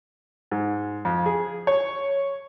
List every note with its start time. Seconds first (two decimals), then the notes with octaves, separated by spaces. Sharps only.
0.52 G#2
1.05 F2
1.26 G#4
1.67 C#5